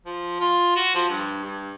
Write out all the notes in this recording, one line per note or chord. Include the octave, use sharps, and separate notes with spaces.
F3
F4
F#4
F3
G2
G2